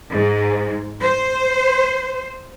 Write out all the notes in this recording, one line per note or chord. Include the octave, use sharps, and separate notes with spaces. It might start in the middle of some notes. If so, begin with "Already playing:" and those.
G#2
C5